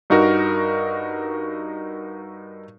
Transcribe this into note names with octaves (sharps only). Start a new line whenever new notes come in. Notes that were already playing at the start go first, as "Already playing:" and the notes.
G2 D#4 F#4 A#4